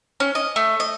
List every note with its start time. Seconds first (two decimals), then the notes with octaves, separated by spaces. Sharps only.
0.20 C#4
0.35 D#5
0.56 A3
0.80 D#5